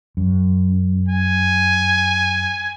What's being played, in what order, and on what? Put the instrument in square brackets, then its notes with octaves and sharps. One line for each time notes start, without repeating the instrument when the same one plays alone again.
[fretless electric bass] F#2
[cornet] G#5